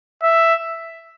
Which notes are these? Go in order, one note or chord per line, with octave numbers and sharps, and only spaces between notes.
E5